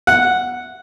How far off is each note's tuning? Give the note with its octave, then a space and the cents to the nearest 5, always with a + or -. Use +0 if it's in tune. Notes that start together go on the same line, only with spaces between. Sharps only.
F#5 -5